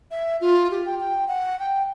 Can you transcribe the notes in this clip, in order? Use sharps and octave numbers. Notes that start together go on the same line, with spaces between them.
E5
F4
G4
G5
G5
F#5
G5